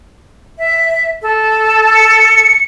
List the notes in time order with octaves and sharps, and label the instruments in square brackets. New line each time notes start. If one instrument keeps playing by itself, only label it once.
[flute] E5
A4
[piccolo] C#7